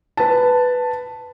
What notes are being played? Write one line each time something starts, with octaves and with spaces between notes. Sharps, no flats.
B4 A5